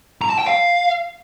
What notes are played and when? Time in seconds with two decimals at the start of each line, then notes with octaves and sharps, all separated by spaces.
0.22 A#5
0.30 A5
0.39 G5
0.47 F5